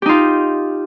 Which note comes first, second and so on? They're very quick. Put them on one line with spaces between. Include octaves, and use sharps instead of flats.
G4 D#4 F4